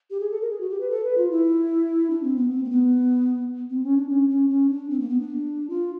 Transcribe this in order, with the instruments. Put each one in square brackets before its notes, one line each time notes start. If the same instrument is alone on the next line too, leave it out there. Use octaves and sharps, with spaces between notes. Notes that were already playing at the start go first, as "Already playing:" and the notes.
[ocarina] G4
G#4
A4
A#4
G#4
F#4
G4
B4
A4
B4
F4
E4
D4
C4
B3
C4
A#3
B3
C4
C#4
D4
C#4
C#4
C#4
D4
C4
A#3
B3
D4
F4